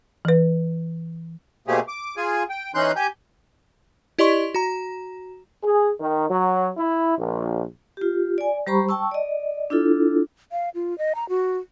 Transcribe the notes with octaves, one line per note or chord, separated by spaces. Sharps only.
E3 B4
B2 A3 A#3 C4 G4 G#4
D6
F4 G#4 G#5
G5
E3 C#4 D#4 C6 F#6 G6
G4 G#5 G6
E4 G4 D5 D#5 C6 C#6
F#4 A#5
G#4
D#3
F#3
E4
A#1
F4 G4
D5 G#5
G3 G4 C5 A#5 B5 C#6
G5 A5 C#6 E6
D5 D#5
D4 E4 F4 A4
F5
F4
D#5
A#5
F#4